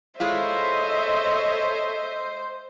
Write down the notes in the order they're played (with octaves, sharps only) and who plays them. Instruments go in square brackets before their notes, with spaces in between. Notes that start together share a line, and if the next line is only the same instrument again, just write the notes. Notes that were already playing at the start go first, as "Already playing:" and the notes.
[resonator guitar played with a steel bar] G#3 E4 F4 [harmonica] A4 C#5 [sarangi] C5 [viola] D#5 E5